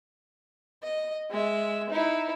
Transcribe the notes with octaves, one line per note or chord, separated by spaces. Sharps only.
D#5
G#3 E5
D#4 E4